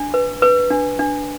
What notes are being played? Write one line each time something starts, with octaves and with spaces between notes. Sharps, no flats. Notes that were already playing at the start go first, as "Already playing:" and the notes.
Already playing: D4
B4
B4
D4
D4